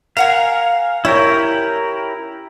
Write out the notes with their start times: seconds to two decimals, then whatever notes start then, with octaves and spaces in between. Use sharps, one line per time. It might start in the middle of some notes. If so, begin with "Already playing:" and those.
0.17 A#4 F5 F#5 G#5
1.05 C#4 E4 G4 A#4